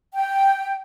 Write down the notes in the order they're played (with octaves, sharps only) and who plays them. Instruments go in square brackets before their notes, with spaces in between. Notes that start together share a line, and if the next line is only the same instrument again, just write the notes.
[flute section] G5